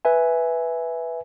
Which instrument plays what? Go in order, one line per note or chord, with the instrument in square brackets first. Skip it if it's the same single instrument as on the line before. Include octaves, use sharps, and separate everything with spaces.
[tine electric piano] B4 E5 G#5